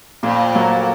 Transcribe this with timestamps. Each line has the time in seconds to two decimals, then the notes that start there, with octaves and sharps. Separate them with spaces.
0.23 F2 A#2
0.55 F#3 A#3